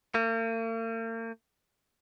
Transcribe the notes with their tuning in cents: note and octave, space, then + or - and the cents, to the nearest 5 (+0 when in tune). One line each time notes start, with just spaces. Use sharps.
A#3 -45